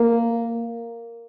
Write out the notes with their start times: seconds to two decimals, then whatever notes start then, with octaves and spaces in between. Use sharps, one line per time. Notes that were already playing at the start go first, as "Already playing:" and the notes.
Already playing: A#3